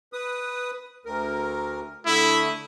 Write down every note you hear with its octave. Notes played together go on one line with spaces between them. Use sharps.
B4 D#6
D2 A#4
D3 A3 E4 D#6